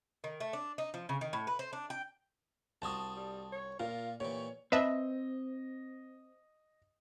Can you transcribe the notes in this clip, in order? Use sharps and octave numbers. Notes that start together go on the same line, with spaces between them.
D#3
A3
D4
D#4
F3
C#3
D#3
A2
B4
C5
D4
G5
C2 F4 F#4 A5 D#6
G3
C#5
A#2 F4 A#4
A#2 E3 G4 C#5
C4 B4 D#5 E5 A5